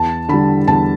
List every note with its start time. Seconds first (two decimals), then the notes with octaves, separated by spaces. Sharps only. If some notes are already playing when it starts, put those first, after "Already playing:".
Already playing: E2 A5
0.29 D3 G3 B5
0.68 E2 A5